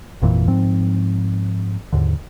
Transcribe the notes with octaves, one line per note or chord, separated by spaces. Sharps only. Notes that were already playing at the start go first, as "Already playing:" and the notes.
G#1 F2 A#2 E3
G#2 F3 C4
D#2 G#2 D3